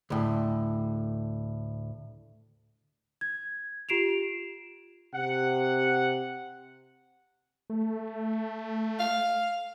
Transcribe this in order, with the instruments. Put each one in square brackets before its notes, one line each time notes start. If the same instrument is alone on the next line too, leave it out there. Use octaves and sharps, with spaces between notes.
[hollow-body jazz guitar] D2 A2
[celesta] G#6
F4 G4 C7 D7 E7 F7
[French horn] C3 [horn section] F#5
[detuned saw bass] A3
[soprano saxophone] F5